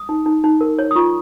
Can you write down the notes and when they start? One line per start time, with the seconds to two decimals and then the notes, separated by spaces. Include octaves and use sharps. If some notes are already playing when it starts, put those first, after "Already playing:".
Already playing: D#6
0.09 D#4
0.26 D#4
0.44 D#4
0.61 A#4
0.79 C#5
0.91 D#6
0.96 F4 C#6